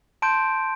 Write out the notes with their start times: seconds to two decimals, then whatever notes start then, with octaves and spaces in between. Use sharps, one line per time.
0.22 A5 C6 G6 D7